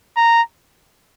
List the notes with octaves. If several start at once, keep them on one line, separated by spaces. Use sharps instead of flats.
A#5